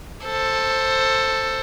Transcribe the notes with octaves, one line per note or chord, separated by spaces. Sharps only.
A4 C5